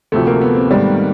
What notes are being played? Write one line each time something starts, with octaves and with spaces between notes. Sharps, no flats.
D2 C3 F3 A3
A#3
B3
C4
G#2 D#3 G3